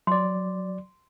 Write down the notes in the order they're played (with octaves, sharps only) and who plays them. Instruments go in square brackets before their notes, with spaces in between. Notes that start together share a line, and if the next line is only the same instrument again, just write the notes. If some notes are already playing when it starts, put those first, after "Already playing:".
[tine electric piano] F#3 D5 [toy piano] C6